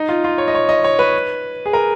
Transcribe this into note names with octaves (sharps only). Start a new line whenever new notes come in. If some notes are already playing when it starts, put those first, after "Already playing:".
Already playing: D#4
F4
F4
C#5
D#5
C#5
D#5
C#5
B4
G#4
A#4